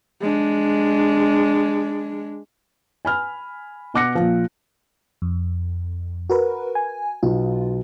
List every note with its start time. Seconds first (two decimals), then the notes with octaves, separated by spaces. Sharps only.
0.22 G#3 D4
3.05 G#5 B5 F6
3.94 B2 F#5 D6 F#6 A#6 C#7
4.15 A#2 F3
5.22 F2
6.30 F#4 A#4 B4
6.75 G#5
7.23 B1 F4